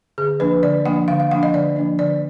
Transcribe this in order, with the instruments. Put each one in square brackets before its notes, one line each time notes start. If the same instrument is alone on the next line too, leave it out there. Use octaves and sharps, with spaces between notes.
[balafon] D3 G#4
F3 A#3 D4 B4
D3 D5
F3 A#3 D4 F#5
D3 F5
F5
F3 A#3 D4 F#5
D#5
D3 D5
F3 A#3 D4
D3 D5